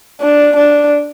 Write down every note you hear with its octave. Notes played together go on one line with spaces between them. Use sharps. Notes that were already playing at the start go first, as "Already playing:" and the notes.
D4
D4